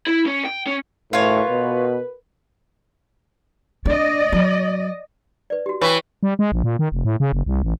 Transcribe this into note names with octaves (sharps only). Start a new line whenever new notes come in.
E4
C#4
G5
C#4
A2 F4 F#4 A#4 B4 C#5
B2
D4 D5 D#5
F#3
B4 D5
F#4 G4
E3 B4 C#5 G5 C#6
G3
G#3
A#1
A#2
D#3
F1
A2
C#3
F#1
C2
A1